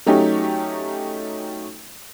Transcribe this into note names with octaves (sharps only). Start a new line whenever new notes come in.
F#3 A3 C#4 D#4 G4